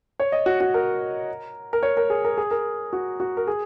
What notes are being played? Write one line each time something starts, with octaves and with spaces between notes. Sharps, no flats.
C#5
D#5
F#4
F#4
A#4
A#4
C#5
A#4
G#4
A#4
G#4
A#4
F#4
F#4
A#4
G#4